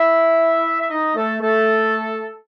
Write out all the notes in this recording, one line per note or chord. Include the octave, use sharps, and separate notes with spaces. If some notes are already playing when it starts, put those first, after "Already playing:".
Already playing: E4 E5
E5
D#4 D#5
A3 A4
A3 A4